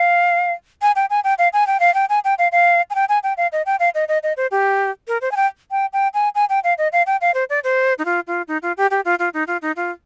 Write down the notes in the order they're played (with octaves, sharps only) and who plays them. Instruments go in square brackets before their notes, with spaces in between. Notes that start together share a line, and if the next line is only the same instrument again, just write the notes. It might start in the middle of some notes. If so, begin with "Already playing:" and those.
Already playing: [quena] F5
G#5
G5
G#5
G5
F5
G#5
G5
F5
G5
G#5
G5
F5
F5
G#5
G5
G#5
G5
F5
D#5
G5
F5
D#5
D#5
D#5
C5
G4
A#4
C5
G#5
G5
G5
G5
G#5
G#5
G5
F5
D#5
F5
G5
F5
C5
D5
C5
D#4
F4
F4
D#4
F4
G4
G4
F4
F4
D#4
F4
D#4
F4